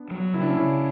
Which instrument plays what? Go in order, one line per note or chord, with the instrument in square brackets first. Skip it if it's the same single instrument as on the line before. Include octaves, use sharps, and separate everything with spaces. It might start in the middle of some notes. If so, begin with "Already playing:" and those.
Already playing: [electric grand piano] B3 D4
[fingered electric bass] F#3
[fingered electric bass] C#3 [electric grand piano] E4
[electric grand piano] D4
C#4 E4
[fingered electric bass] C#3